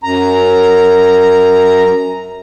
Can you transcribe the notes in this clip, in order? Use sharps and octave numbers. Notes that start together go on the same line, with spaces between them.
F#2 A#5